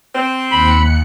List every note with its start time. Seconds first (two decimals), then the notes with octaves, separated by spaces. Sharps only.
0.15 C4
0.51 D#2 B5 F#6 C#7